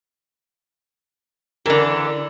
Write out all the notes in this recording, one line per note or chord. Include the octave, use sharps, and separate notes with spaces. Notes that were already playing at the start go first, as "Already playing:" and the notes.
D3 E3 A#4